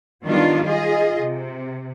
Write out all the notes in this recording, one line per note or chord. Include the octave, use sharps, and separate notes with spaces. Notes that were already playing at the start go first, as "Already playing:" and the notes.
D#3 F#3 G3 B3 D4 F4
F4 G#4 D#5
C3